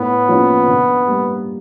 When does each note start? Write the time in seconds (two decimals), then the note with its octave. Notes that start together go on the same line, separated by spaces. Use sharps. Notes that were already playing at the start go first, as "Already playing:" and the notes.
Already playing: A2 B3
0.28 F3 A#3 C#4
0.68 D3
1.07 G3 A#3